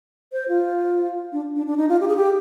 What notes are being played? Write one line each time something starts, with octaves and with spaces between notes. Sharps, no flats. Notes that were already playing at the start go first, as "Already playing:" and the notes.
C5
F4
D4
D4
D4
D#4
F4
G4
G#4
G4